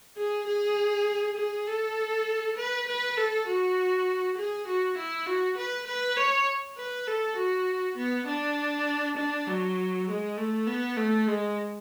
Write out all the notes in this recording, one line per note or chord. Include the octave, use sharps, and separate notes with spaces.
G#4
G#4
G#4
A4
B4
B4
A4
F#4
G#4
F#4
E4
F#4
B4
B4
C#5
B4
A4
F#4
B3
D4
D4
F#3
G#3
A3
B3
A3
G#3